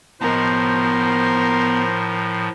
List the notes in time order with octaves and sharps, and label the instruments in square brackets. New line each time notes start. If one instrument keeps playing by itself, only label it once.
[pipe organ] A2 F3 [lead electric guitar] B3 D#5 [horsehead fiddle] A#4 [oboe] C5